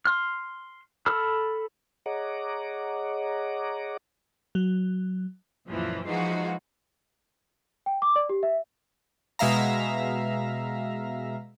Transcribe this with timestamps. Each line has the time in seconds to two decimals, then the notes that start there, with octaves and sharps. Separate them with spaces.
0.05 C6 F6
1.06 A4 B5 E6 F6
2.06 G#4 C#5 D#5 F#5 A#5 D6
4.55 F#3
5.69 C#2 F#2 A#2 E3 F3
6.06 E3 F3 G#3 D#4 F4 F#4
7.86 G5
8.02 D6
8.16 D5
8.29 G4
8.43 E5
9.39 B2 G#3 E5 F5 A#5